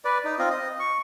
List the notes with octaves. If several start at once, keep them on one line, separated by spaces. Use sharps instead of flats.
B4 D5
D#4
C4 F4 D#5
D#5
C#6